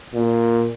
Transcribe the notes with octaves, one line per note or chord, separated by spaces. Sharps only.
A#2